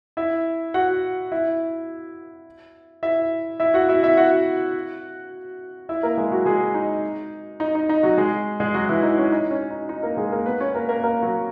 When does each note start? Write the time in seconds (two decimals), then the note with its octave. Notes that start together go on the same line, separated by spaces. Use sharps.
0.17 E4 E5
0.74 F#4 F#5
1.32 E4 E5
3.03 E4 E5
3.60 E4 E5
3.74 F#4 F#5
3.89 E4 E5
4.03 E4 E5
4.17 F#4 F#5
5.89 E4 E5
6.03 A#3 A#4
6.17 G#3 G#4
6.31 F#3 F#4
6.46 G#3 G#4
6.74 D#4
7.60 D#4
7.75 D#4
7.89 D#4
8.03 F#3 F#4
8.18 G#3 G#4
8.60 G#3 G#4
8.74 F#3 F#4
8.89 E3 E4
9.03 D#4
9.18 C#4
9.32 D#4
9.51 C#4
9.70 D#4
9.89 D#4
10.03 A#3 A#4
10.17 G#3 G#4
10.32 A#3 A#4
10.46 B3 B4
10.61 C#4 C#5
10.74 A#3 A#4
10.89 A#3 A#4
11.03 A#3 A#4
11.22 F#3 F#4